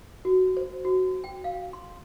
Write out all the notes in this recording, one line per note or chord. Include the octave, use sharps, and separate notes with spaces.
F#4
C5
F#4
G5
F5
C6